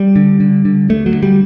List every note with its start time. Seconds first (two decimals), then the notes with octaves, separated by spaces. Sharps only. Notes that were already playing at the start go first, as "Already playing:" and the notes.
Already playing: G3
0.16 D3
0.40 D3
0.65 D3
0.89 D2 A3
1.06 F#3
1.14 D3
1.23 G3